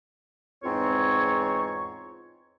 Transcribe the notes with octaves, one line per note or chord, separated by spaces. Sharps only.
E2 G#2 C4 F4 C#5